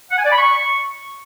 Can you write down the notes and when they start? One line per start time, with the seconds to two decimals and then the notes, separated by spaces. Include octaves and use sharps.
0.11 F#5
0.18 G#5
0.24 D5
0.31 B5
0.38 C#6